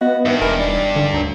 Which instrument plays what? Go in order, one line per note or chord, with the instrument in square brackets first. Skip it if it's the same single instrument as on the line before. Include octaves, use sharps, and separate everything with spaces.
[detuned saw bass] B3 [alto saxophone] F#4 [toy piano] D#5 F5
[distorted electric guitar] G2 [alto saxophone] D#3 [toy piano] A#4 C5 E5
[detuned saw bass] E1 [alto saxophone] A#4 [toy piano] G#5 B5
[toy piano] D#4 C#5 [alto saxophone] D5
[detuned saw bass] D3 [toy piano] D4 D#4
[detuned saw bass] D2 [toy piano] A#4 C#5 A#5